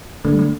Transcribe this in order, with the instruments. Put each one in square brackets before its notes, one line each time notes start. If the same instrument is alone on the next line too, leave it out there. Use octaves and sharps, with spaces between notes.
[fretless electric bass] D3 [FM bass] A3
[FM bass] G3
A3